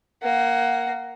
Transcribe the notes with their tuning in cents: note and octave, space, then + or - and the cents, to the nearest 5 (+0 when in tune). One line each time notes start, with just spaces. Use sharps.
A#3 +0 F#5 +25